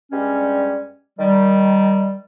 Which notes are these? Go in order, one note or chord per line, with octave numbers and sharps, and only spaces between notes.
G2 G3 G#3 C#4
D#3 G3